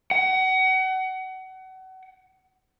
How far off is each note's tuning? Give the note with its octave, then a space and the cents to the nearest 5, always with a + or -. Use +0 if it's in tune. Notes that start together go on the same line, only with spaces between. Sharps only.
F#5 +30